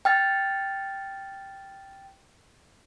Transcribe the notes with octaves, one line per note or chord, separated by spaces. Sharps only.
G5 F6 A6